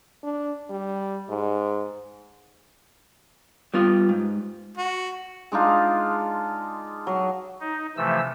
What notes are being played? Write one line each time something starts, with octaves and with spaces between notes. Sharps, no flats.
D4
G3
G#2
G3 B3 F4
G#2
F#4
G#3 D4 D#4 F4
F#3
D#4
C3 E3 F3 A3 E6